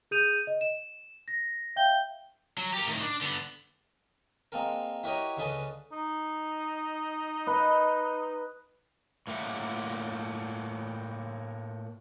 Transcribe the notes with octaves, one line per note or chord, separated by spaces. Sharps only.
G#4 D#6 G6 D#7 F7
D#5
E7
A#6
E5 F5 G5 G6 G7
F#3
G4 A#4
A2 D#3
D4
D3 B3
G#3 A#3 C4 A4 A#4
E4 F#4 G4 A#4 C#5 D#5
C#2 D3 C#4 B4 D#5 A5
D#4
B4 D#5
A2 A#3 F4 E5 F#5